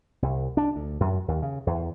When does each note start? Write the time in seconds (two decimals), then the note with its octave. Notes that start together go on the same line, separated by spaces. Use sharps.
0.22 C2
0.57 D4
0.76 D2
1.00 F#2
1.28 D#2
1.42 C#3
1.67 E2